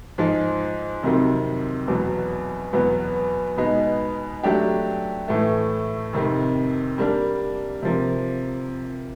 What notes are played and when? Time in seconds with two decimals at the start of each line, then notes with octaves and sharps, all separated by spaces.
0.18 G#2 F3 G#3
1.03 F2 C3 D#3 F#3
1.88 E2 B2 F#3 B3
2.73 E2 B2 F#3 B3
3.57 B2 G#3 B3 D#4
4.43 F#3 A3 D4 G4
5.28 A2 E3 A3
6.13 F2 C3 D#3
6.98 G3 A#3 D4
7.83 C3 F3 A#3